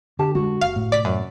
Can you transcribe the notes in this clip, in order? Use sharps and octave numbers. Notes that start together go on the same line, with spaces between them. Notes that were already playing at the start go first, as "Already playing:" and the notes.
D3 G4 G5 A5
F2 G#3 F#4
F#1 F5
A2
C3 D5 B6
F#2